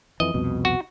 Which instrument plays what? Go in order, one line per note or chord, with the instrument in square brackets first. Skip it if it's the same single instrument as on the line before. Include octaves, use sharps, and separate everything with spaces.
[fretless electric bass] F2 E3 [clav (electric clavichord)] D#5
[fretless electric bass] C2 F2 B2
[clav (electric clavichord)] F#4